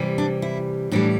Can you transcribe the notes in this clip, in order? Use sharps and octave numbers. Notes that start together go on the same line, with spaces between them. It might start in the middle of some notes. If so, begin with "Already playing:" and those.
Already playing: C3 E3 G3
D4
E4
A2 E3 G3 D4